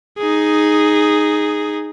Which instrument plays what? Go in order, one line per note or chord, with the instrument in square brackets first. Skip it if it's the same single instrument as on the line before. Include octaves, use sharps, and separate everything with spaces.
[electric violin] D#4 G#4